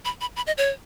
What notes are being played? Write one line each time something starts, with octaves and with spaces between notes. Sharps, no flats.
B5
B5
B5
D#5
C#5